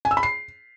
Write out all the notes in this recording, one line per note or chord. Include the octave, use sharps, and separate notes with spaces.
G#5
E6
B5
C7